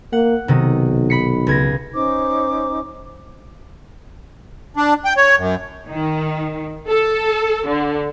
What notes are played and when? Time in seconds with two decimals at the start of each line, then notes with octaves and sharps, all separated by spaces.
0.13 A#3 F#5
0.48 B1 C3 D#3 D#6
1.10 B5 B6 C#7
1.47 C#2 G#6 A#6
1.94 C#4 D#4 C5 D6
4.77 D4
5.05 G5
5.17 C#5
5.37 F#2
5.89 D#3
6.87 A4
7.66 D3